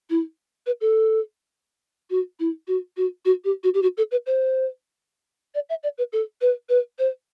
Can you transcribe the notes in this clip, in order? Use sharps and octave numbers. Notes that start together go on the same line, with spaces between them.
E4
B4
A4
F#4
E4
F#4
F#4
F#4
G4
F#4
G4
F#4
A4
B4
C5
D5
E5
D5
B4
A4
B4
B4
C5